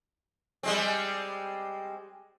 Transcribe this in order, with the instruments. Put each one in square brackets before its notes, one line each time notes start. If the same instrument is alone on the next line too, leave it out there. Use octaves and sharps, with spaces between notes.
[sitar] G3 G#3 C4